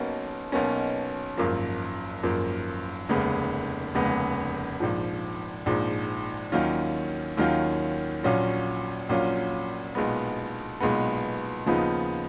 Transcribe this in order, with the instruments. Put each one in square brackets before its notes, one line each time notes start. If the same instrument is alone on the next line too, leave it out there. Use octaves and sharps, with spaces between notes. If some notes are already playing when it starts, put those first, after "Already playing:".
Already playing: [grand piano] B1 B2 A#3 C#4
B1 B2 A#3 C#4
G#1 F#2 F3 A#3
G#1 F#2 F3 A#3
F1 D#2 C#3 G#3 B3
F1 D#2 C#3 G#3 B3
A#1 G#2 F3
A#1 G#2 F3
D#2 D#3 F#3 C#4 F4
D#2 D#3 F#3 C#4 F4
A#1 A#2 F#3 C#4 F4
A#1 A#2 F#3 C#4 F4
B1 A#2 G#3 B3
B1 A#2 G#3 B3
D#2 C#3 F3 B3 D#4